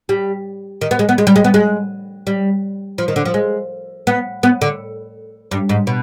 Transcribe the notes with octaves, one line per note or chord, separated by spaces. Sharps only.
G3
D#3
B3
G#3
B3
G#3
G3
G#3
B3
G#3
G3
F3
D#3
D3
F3
G#3
B3
B3
D3
G2
G#2
B2